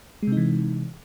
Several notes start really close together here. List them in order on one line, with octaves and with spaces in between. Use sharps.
G#3 C3 D#4 E3